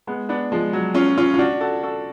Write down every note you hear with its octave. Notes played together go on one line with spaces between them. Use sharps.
G#3 B3
B3 D4
F3 G#3
F#3
C#4 F4
C#4 F4
F4
D4 F#4
F#4 A4
F#4 A4